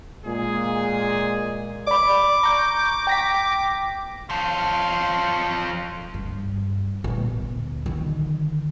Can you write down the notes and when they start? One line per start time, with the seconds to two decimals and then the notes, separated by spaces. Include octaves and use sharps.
0.25 A#2 G#3 G#4
1.87 D5 B5 D6
2.43 A#5 C#6 G6
3.07 G5 A#6 B6
4.30 F3 A4 C5 C#5 F5
6.14 G2
7.04 A#2 B3
7.42 D2
7.86 D3 D#3